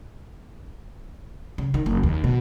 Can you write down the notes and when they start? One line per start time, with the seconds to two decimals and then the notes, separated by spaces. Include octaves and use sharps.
1.58 C#3
1.74 D#3
1.86 F#1
2.03 D#2
2.24 B2